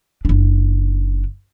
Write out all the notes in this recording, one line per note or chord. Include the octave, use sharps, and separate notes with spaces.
F#1 D4